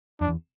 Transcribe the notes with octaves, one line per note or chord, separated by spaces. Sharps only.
F2 D4
E2